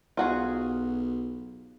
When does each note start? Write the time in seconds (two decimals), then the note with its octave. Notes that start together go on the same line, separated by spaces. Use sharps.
0.17 B1 F4 F#4 G#4